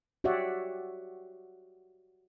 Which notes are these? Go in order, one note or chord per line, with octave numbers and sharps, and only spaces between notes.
F#4 G4 C#5 D5 E5 F#5